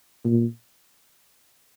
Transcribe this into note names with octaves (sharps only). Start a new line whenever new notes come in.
A#2